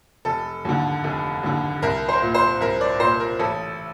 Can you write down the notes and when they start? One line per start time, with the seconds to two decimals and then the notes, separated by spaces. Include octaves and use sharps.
0.25 F1 A4
0.65 D#2 D3
1.04 F1
1.43 D#2 D3
1.82 C2 A#4
2.09 C5
2.22 A#2
2.35 C5
2.60 C2 A#4
2.81 D5
3.00 A#2 C5
3.20 A#4
3.39 A1 A4